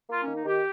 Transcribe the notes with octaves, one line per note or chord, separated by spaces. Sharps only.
A#3 F4
C#4
D#3
D#4
D#3 G4